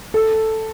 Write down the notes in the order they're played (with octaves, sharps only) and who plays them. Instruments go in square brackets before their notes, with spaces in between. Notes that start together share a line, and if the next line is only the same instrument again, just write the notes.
[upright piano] A4